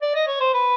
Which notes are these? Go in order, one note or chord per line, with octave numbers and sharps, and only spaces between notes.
D5
D#5
C#5
C5
B4